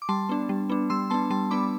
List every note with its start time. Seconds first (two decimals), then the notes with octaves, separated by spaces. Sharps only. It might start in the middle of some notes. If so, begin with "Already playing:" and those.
0.02 D6
0.09 G3 A5 C6
0.29 B3 D4
0.49 G3
0.70 B3 D4
0.90 G3 C6 E6
1.10 B3 D4 A5 C6
1.30 G3 A5 C6
1.51 B3 D4 B5 D6